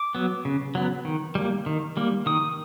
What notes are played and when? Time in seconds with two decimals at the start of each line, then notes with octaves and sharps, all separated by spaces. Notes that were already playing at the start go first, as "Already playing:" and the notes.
Already playing: D6
0.15 F#3 B3
0.45 C#3
0.75 F#3 B3
1.05 D#3
1.35 G3 A#3
1.66 D#3
1.97 G3 A#3
2.26 D#3 D#6